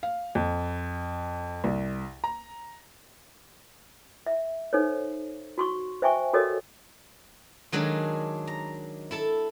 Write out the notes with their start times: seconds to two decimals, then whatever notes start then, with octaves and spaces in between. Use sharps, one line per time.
0.03 F5
0.35 F2
1.64 C2
2.24 A#5
4.27 E5
4.73 D#4 A4 C5 C#5
5.58 F#4 C6 C#6
6.02 C5 E5 G5 G#5 C#6
6.33 F#4 G4 A4 A#4 C#5 D#5
7.72 D#3 F#3 G#3 D4
8.47 A#5
9.11 E4 A4 A5